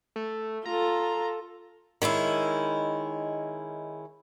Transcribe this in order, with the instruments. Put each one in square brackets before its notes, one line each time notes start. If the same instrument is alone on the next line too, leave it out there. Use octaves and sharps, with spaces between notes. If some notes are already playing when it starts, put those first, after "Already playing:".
[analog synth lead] A3
[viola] F4 A4 [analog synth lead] A#5
[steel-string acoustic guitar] D#3 G#3 C#4 E4